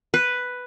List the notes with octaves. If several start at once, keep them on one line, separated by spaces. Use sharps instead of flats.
B4